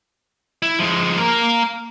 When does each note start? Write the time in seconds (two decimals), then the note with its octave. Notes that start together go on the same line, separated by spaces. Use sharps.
0.62 E4
0.79 F3 G#3
1.18 A#3 A#4